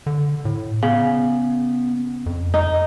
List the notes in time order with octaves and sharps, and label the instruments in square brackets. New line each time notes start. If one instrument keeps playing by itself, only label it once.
[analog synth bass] D3
A2
[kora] C#3 [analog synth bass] B3
[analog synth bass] F2
[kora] D#4